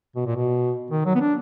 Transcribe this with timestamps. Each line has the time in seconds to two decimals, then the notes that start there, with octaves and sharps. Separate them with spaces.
0.16 B2
0.26 A#2
0.36 B2
0.91 D#3
1.06 F#3
1.15 B3
1.21 D4